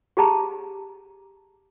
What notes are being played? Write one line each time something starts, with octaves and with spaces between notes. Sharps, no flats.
G4 G#4 A5 A#5